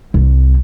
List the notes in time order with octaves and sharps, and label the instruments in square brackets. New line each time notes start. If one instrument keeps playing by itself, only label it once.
[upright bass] C2